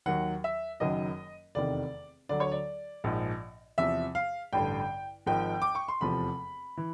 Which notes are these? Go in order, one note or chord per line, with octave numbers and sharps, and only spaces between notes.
D#2 D#3 F#3 F#5
E5
F#1 F#2 D#3 F#3 D#5
F1 E2 C3 D#3 D5
D2 D3 F#3 D5
C#5
D5
A#1 G#2 F3
E2 C3 F3 E5
F5
A1 G2 D3 G5
G#1 G#2 F3 G5
D6
C#6
C6
F1 E2 C3 F3 B5
E3